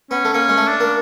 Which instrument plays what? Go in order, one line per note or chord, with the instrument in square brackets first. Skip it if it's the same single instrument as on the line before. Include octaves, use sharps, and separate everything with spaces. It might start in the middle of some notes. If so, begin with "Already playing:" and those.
[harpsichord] B3 [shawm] C#4
[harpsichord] A3
[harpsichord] A#3 [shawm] C#4
[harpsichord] G#3
A3
[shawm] D4
[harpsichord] A#3